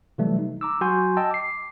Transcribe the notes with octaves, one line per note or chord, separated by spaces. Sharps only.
C3 E3 F#3 G3 A3
D#4
A#5 D6 E6
F#3 F#4 G#5 C6 G6
D#5 G5 A5 E6
D6 C7